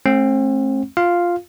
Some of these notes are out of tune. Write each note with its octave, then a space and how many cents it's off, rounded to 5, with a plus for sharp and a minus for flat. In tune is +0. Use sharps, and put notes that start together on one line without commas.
A3 -25 C4 +40 F#5 +0
F4 +0 F5 +0